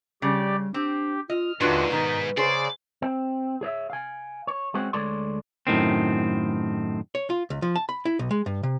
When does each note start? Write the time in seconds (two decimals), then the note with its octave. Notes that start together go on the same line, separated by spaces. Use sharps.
0.22 C#3 G3 G4 D5
0.74 C4 D4 G4
1.30 F4 D#5 F6
1.61 D#2 G#2 D3 D4 F4 F#4 B4
1.90 B2 D#3 B3 D#4
2.37 C#3 G#4 C5 D5
3.02 C4
3.61 G#4 C#5 D#5 E5
3.90 F5 G#5
4.47 C#5
4.74 G#3 C4 C#4 F#4
4.93 D2 G#3 A4 C#5 D5 C6
5.67 F#2 A2 D#3 C4
7.15 C#5
7.30 F4
7.50 C#2
7.62 F3
7.76 A5
7.89 B5
8.05 E4
8.19 B1
8.31 G#3
8.46 G2
8.63 C3